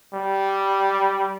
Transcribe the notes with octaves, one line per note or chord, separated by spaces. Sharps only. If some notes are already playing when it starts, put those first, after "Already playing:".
G3